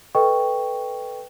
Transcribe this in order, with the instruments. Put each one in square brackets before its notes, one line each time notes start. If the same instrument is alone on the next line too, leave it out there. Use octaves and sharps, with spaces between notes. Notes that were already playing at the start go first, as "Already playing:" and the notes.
[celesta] A4 B4 D#5 G5 C#6